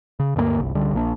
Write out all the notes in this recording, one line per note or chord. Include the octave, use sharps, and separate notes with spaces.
C#3
D2 G2 F#3 A#3
G1 C2
C#2 D3 G3
A#1 A#3 D4